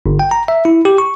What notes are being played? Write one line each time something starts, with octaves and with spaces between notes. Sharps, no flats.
G1
G5
A#5
E5
E4
G4
C#6